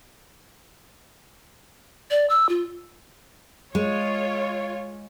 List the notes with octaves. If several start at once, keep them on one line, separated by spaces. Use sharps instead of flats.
D5
E6
F4
G#3 F4 C#5